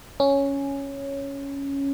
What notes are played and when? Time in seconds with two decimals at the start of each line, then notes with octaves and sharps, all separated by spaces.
0.20 C#4